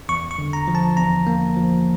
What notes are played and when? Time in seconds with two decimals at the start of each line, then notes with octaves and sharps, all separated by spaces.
0.09 E2 C#6
0.31 C#6
0.38 D3
0.53 A#5
0.68 F3
0.75 A5
0.97 E2 A#5
1.27 A#3
1.56 F3